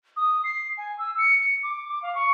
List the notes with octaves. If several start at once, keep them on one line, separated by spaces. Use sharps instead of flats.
D#6
C7
G#5
E6
C#7
C#7
D6
D6
F5
C#6